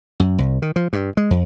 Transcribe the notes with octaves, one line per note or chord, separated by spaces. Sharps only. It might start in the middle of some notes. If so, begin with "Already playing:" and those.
F#2
C2
D#3
F3
G2
G#3
F2